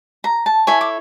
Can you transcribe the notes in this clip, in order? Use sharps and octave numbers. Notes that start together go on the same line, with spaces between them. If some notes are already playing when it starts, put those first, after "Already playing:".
A#5
A5
E4 A4 C#5 G#5
D6